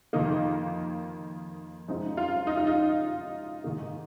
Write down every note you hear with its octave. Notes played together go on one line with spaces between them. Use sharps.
F2 D#3 A#3 D#4
F#2 F3 G#3 C4 D#4
F4
D#4
F4
D#4
G#2 D#3 A#3 D#4